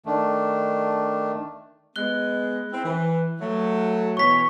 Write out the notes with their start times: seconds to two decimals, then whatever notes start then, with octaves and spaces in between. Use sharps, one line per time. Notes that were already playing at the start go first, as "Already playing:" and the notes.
0.06 D#3 A3 D4
1.96 G#3 B3 F#6 G7
2.71 C4 E4
2.84 E3
3.40 F#3 A3
4.17 B2 E3 C#5 C#6 B6